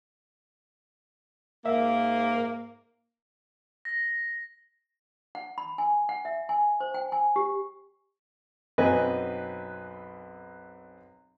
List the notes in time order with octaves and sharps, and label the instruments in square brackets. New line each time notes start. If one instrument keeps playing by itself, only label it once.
[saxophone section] G#2 A#3 [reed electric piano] E5 F5
[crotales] A#6
[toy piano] F#5
B5
G#5
F#5
E5
G#5
C5
G5
G#5
G4
[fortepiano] B1 F#2 C4 B4 D#5 G#5